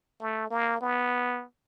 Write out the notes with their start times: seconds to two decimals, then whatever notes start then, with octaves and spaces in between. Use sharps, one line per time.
0.21 A3
0.51 A#3
0.81 B3